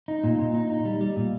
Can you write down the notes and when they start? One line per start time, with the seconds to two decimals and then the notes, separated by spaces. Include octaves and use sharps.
0.08 D#4
0.24 A#2
0.39 A#2
0.54 D#4
0.70 D#4
0.85 G3
1.01 G3
1.16 A#2